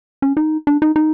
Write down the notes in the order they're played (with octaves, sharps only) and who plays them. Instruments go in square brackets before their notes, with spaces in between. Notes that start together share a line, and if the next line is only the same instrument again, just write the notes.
[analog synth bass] C#4
D#4
D4
D#4
D#4